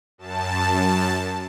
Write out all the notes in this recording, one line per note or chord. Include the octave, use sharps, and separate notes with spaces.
F#2 A5